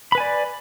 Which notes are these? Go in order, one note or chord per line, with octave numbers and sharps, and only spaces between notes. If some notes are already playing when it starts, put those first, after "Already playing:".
B4 D5 G#5 B5